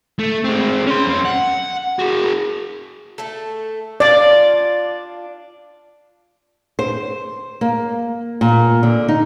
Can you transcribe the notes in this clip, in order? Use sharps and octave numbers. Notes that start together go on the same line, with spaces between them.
A3
G#3 C4
C#4 C6
F2 F5
F#5
F#4 G#4
A3 A4
D4 F4 D5
C5
A#3
A#2
D3
D#4